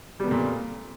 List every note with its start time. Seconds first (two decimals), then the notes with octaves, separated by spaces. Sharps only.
0.20 G3
0.23 B3
0.27 F2
0.31 A#2